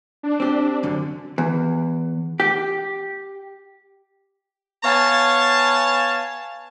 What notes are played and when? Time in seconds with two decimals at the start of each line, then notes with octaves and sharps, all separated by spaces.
0.23 D4
0.40 C4 G4
0.83 F#2 D3
1.38 E2
2.40 G4
4.84 B3 C#5 F5 G#5 A5